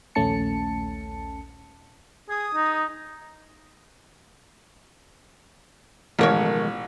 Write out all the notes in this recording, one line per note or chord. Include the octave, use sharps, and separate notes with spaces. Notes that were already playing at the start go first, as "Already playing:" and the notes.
A#1 D#2 A3 C#4 A5 C#7
G#4 D#6
D#4
A1 B2 D#3 F3 G#3 A#4 C#5